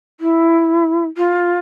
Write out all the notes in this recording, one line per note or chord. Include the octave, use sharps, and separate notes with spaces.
E4
F4